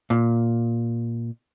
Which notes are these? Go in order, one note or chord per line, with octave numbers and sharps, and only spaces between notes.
A#2